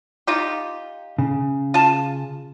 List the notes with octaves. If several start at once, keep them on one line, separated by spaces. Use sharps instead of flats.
D#4 F4 G4
C#3
F4 A5